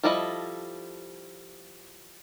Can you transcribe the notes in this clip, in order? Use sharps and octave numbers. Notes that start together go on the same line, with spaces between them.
F3 G3 E4 A4 D#5